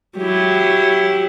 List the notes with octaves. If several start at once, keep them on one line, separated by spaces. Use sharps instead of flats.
F#3 E4 G4